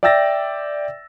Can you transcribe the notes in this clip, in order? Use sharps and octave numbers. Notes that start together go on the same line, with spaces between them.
D5 E5 G5 E6 A6 A#6